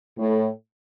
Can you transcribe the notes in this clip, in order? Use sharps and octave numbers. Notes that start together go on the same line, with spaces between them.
A2